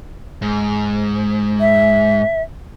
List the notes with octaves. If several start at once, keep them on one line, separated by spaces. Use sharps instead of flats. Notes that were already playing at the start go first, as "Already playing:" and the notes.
G#2
E5